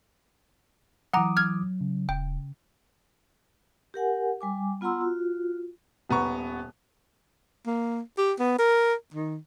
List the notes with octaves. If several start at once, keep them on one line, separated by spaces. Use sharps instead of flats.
E3 F#3 F#5 A#5 D6 D#6
F6 G#6
C#3
D#1 G5
G4 A#4 F#5 G#5
G3 G#5 D6
B3 F4 F#5 A#5 C6 E6
F4 F#4
D#1 B3 A#5 C#6
A#3
G4
B3
A#4
D#3